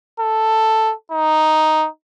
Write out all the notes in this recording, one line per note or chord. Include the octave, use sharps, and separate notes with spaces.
A4
D#4